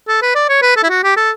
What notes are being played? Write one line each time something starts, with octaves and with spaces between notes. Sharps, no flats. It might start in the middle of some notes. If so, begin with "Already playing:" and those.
A4
B4
D5
C#5
B4
A4
E4
F#4
G4
A4